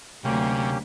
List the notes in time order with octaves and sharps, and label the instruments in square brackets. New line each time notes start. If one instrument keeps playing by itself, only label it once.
[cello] D2 F#3 [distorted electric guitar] C3 [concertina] A#3 C#4 G4